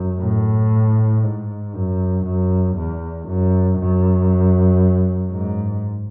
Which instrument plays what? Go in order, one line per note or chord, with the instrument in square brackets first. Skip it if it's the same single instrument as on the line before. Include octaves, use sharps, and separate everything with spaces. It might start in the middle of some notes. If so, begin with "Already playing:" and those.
Already playing: [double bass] F#2
A2
G#2
F#2
F#2
E2
F#2
F#2
G#2